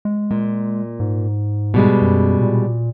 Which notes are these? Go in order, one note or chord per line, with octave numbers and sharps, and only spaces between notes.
G#3
A#2 G#3
G#2
B2 G3 G#3
F#2
A#2